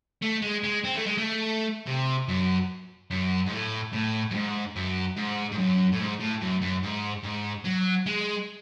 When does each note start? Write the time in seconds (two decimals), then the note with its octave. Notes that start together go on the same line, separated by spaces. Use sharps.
0.22 A3
0.42 G#3
0.63 G#3
0.84 C4
0.95 A3
1.06 G#3
1.18 A3
1.87 C3
2.28 F#2
3.11 F#2
3.46 G#2
3.51 A2
3.93 A2
4.31 F#2
4.34 G#2
4.76 F#2
5.17 G#2
5.53 G#2
5.58 F#2
5.93 A2
6.00 G#2
6.20 A2
6.41 F#2
6.62 F#2
6.83 G#2
7.23 G#2
7.65 F#3
8.06 G#3